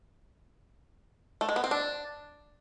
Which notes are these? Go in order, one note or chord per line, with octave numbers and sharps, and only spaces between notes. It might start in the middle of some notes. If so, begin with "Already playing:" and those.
A3
G#3
B3
C4
D4